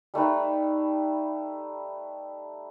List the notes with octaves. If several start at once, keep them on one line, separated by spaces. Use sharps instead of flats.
G3 A3 D#4 B4